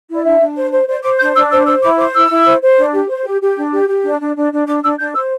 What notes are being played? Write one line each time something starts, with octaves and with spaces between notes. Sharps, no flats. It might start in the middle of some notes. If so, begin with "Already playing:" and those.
E4
D5
D4 E5
D4
C5
C5
C5 D5
C5 D6
D4 G6
D4 E6
C5 E6
C5 E6
E4 D6
C5 D6
E4 E6
E4
C5
C5
D4
G4
C5
G4
G4
D4
G4
G4
D4
D4
D4
D4
D4 D6
D4 E6
D4 G6
C5 E6